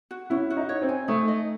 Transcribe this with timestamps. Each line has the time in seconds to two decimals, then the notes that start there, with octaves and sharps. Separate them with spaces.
0.11 F#4
0.30 C#4 E4
0.50 F#4
0.57 D#4
0.69 C#5
0.82 C4
0.89 G#5
1.08 A3 D#4
1.28 D#5